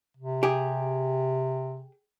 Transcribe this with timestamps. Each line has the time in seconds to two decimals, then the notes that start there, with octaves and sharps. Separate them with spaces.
0.17 C3
0.43 G4 G#4